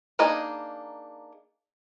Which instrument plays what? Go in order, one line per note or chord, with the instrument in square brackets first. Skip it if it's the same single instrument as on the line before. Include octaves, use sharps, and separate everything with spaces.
[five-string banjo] A#3 D4 D#4 G#4 D#5